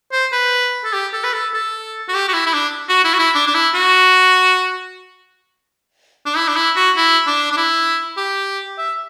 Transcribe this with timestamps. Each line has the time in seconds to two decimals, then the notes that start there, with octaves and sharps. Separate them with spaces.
0.12 C5
0.32 B4
0.85 A4
0.93 G4
1.13 A4
1.24 B4
1.33 A4
1.54 A4
2.09 F#4
2.14 G4
2.28 F#4
2.34 E4
2.46 E4
2.54 D4
2.89 F#4
3.04 E4
3.14 F#4
3.19 E4
3.34 D4
3.47 D4
3.54 E4
3.74 F#4
6.26 D4
6.36 E4
6.48 D4
6.56 E4
6.76 F#4
6.97 E4
7.27 D4
7.52 D4
7.57 E4
8.17 G4
8.78 E5